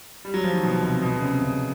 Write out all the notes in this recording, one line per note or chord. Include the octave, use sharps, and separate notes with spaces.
G3
F#3
F3
D#3
B2
C3
B2
C#3
C3
C#3